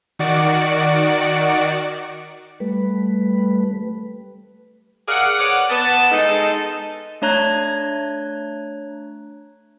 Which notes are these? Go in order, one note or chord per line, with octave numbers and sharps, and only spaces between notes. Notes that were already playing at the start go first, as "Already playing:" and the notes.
D#3 F#4 D5 C#7 D7
G3 A3 B4
G#4 A#4 D5 F5 F#5
B4 C#5 D5 F#5
B3 A5
G#3 D#4 A4
A3 D4 C#5 A#5 F#6 G#6